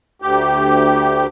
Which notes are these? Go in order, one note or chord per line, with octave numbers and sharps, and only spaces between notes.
D2 G4